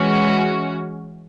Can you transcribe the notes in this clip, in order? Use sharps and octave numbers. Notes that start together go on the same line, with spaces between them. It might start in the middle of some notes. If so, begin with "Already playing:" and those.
Already playing: E3 G#3 C#4 F#4